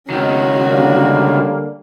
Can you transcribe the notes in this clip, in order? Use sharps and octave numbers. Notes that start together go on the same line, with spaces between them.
C#2 D#3 C#4 F#4
D3 G3 A#3